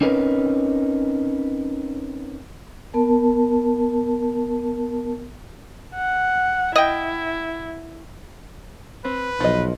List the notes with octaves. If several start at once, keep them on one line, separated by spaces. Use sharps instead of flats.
C4 C#4 D#4 A#4 B4
B3 A#4 A5
F#5
E4 D#5 G5
C4 B4
B1 F3 D#5